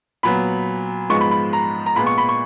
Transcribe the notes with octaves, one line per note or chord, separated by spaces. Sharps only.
A#2 F#3 B3 B5
G#2 F3 G#3 B3 C#6
B5
B5
A#5
A#5
A#2 G#3 B3 B5
C#6
B5
C#6